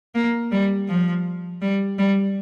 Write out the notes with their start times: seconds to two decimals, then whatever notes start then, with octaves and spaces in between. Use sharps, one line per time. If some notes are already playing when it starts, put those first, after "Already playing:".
0.15 A#3
0.52 G3
0.88 F3
1.62 G3
1.98 G3